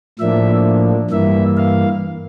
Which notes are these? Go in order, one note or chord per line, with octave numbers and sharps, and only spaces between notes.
A2 F3 A#3 D4 E5
G2 E3 A#3 E5
F5